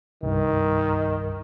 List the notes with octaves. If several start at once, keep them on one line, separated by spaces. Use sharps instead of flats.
C2 G2 D#3